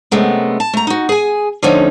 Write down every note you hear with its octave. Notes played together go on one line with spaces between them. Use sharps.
F#2 C3 G#3 A3 B3
A5
A3 A#5
D#4 F#4
G#4 G#5
D3 F3 A3 C#4 D#4